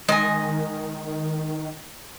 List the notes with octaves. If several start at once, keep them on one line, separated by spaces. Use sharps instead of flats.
D#3 G#3 D#5 G#5